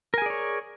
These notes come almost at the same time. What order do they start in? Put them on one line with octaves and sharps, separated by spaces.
A#4 G#5 G#4 D5 C#5